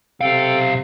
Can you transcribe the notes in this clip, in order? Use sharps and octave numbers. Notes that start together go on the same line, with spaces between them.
B1 C3 A4 F5 G5